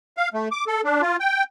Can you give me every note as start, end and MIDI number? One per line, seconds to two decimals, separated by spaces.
0.17 0.29 77
0.34 0.48 57
0.52 0.64 86
0.67 0.81 69
0.84 1.02 62
1.02 1.17 65
1.20 1.43 79